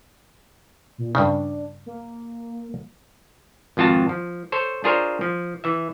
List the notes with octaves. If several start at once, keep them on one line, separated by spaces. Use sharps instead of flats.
A#2
G2 C#3 D4
A#3
G#1 F2 F4 F#4 A5
F3
A4 C5 C#5
D4 F4 G#4 A#4 C5 C#5
F3
E3 E5